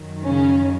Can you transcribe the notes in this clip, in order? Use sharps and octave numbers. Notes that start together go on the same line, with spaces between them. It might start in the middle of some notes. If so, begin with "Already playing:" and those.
Already playing: F#2 D#3 F#3
C#3 C#4